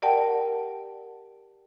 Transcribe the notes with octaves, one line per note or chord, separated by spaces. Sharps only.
G4 A#4 D5 F#5 G5 A5